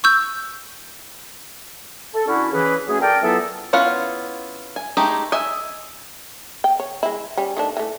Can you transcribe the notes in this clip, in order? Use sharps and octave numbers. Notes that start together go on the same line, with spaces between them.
C#6 E6 G6
A4
D3 C#4 E4 F#4
C#3 E3 C#4 G#4 B4
F#3 A3 C#4 G#4
A4 A#4 D5 G5
E3 F#3 B3 F4 A4
B3 C#4 E4 F4 F#5
G#5
G#3 A3 D#4 G4 G#4
D#5 E5 G#5
G5
C#5
G#3 E4
G3 C#4
D#3 A3 D4
E3 A3